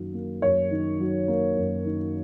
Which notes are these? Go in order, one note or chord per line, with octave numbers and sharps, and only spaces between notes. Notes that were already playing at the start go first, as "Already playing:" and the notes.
Already playing: F#2 D#3 F#3 A#3
A#3
F#2 C#5
D#3
F#3
A#3
F#2
D#3